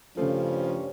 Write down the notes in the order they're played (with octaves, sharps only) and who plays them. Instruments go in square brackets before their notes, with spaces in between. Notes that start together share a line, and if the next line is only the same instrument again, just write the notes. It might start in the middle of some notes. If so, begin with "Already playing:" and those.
[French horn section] G2 G3 C#4 [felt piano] C#3 A3 [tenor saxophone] F3